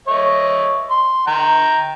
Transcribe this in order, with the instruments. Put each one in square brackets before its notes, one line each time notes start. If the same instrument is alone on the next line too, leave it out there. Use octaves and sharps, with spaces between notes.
[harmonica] C#5 D#5 E5
C6
G5 A#5